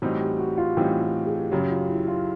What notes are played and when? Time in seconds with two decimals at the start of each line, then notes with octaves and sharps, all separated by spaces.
0.02 A2 E3 G3 C4 D#4 F#4
0.20 G4
0.39 F#4
0.58 F4
0.77 A2 E3 G3 C4 D#4 G4
1.01 G4
1.26 G#4
1.51 F#2 C#3 F#3 G4
1.70 F4
1.89 E4
2.08 F4